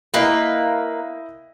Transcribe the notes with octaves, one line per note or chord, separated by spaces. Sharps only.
A#3 E4 B4 D#5 G5